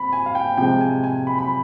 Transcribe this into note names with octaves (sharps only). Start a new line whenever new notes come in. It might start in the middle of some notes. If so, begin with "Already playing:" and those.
Already playing: C4 B5
G#5
F5
G5
C3 F3 G#3 G5
G#5
G#5
B5
B5